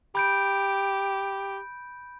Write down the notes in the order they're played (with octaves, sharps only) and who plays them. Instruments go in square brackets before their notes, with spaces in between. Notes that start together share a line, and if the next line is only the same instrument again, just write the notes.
[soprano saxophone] G4 [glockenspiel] B5 G6 D7